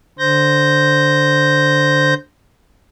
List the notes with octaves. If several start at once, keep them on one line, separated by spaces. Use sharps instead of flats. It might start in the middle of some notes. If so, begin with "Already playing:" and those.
D3 C5 G6 A#6